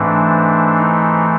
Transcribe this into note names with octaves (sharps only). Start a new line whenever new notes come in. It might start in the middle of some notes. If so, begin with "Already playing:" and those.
Already playing: G#2 E3 A3 C4 D4
D#4